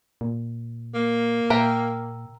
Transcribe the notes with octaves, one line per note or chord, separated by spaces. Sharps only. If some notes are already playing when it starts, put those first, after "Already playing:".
A#2
A#3
A#2 A#4 E5 G5